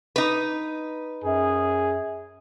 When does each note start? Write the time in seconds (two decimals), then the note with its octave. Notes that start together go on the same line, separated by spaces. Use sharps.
0.16 D#4 B4
1.24 F#2 G#4